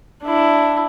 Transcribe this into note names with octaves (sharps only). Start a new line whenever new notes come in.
D4 E4